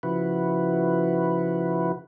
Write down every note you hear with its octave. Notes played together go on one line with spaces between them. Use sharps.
C#3 F3 E4 F#4 B4